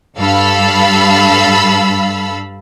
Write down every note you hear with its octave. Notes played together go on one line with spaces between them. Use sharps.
G2 A4 F5 B5 E6